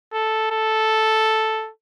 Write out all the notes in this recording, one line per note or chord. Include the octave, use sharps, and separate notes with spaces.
A4
A4